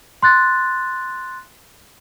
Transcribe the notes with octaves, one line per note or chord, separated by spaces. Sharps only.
C6 F#6 A6